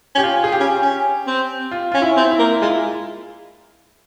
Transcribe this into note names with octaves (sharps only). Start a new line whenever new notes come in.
C#4
G4
F4
G#4
G4
C#4
C#4
C4
F4
C#4 F4
E4
C4
E4
A#3
G#3 F4
E4